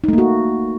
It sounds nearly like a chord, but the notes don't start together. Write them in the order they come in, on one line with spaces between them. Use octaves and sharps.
D#4 A3 A#3 F#4